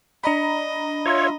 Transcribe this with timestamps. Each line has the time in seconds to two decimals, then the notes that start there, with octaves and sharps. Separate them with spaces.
0.24 D4 D#5 A#5 B5
1.06 F4 C#5 E5